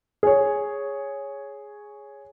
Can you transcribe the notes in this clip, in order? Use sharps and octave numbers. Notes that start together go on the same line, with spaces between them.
G#4 C#5